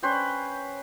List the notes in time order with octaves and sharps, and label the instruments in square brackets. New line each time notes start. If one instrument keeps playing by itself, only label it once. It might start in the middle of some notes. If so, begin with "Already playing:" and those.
[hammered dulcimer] C#4 B4 C5 G5